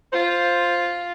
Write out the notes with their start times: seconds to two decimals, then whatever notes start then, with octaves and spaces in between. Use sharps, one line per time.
0.13 F4 C5